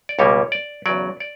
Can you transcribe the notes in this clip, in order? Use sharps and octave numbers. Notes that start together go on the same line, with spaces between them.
D5
C#2 B2 G3 A#3 C#5
D5
E2 C#3 F#3 D5
D5